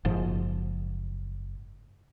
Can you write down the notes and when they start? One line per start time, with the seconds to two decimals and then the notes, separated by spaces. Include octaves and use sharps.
0.05 F#1 G#2 F3